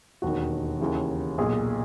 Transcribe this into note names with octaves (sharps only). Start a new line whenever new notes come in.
E1 D#2 D#3 F#4
D#2 C#3 E3
B1 A#2 G#4